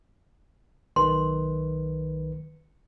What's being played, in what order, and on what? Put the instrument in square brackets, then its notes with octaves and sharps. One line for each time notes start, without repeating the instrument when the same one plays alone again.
[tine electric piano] B1 D#3 B4 [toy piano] C6